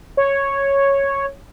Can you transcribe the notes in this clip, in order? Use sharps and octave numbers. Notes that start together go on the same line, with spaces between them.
C#5